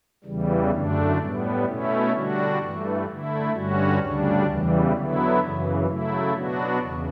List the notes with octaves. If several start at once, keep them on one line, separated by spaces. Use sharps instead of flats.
E2 C#3 E3 G3
F#2 D3 A3 D4
A2 G3 B3
B2 A3 C#4 E4
D3 G3 D4 F#4
G2 E3 A3
D3 A3 E4
G2 D3 G3 C#4 F#4
D2 C#3 G3 D4
E2 C#3 E3 G3
D3 F#3 B3 E4
F#2 C#3 E3
C#3 F#3 A3 E4
B2 F#3 B3 D4 F#4
E2 C#3